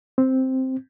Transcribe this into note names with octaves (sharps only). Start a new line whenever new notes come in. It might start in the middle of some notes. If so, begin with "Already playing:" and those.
C4